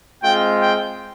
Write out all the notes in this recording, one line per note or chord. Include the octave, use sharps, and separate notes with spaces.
G#3 C4 F4 G5
G5